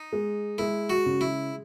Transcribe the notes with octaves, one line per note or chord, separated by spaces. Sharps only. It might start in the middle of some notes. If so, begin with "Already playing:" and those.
Already playing: D#4
G#3
G#3 E4
F#4
C#3
E4